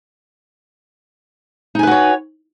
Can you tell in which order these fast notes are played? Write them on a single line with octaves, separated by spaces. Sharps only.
D#4 G#5 B4 F#4 C#5